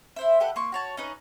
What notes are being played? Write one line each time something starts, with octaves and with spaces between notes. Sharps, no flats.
E4 C5 E5
G4 A4 B4 F#5
A#3 C6 C#6
F#4 C#5 A5
C#4 D#4 B4